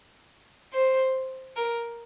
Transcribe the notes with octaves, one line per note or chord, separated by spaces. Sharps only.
C5
A#4